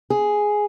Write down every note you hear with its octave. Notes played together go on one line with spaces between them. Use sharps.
G#4